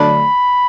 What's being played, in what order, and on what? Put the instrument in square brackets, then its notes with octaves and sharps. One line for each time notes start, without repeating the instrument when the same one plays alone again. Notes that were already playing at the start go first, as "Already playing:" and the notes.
Already playing: [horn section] D3 F#3 A3 D4 B5